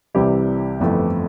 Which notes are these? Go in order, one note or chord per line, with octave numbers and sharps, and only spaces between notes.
C2 C3 E3 G3 E4 G4
G1 F2 E3 A3